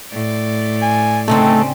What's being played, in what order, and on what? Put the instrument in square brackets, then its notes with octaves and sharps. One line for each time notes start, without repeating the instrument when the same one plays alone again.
[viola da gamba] A2 D5
[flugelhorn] G#5
[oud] D2 C#3 C4 [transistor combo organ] A3 [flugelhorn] D#4